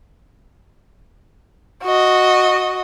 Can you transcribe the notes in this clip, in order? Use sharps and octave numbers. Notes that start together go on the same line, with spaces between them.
F#4 D#5